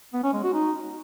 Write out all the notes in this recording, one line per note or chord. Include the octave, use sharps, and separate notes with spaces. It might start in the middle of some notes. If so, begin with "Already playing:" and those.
B3
C#4
G#3
F#4
D#4